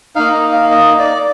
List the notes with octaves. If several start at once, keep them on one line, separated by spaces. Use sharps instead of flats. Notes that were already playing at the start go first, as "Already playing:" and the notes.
A#3 D#4 F5
D#5
F5
D#5
D5